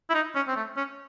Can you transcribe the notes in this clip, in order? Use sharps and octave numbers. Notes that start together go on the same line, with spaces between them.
E4
D#4
C#4
C4
A3
C#4